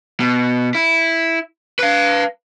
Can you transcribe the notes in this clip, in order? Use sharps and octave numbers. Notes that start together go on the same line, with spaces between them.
B2
E4
B4 F5